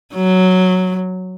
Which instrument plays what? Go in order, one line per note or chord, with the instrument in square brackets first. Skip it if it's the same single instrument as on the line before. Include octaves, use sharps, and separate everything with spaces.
[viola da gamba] F#3